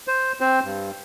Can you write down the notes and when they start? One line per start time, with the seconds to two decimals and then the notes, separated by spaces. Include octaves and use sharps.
0.08 C5
0.40 C4 C5
0.64 G2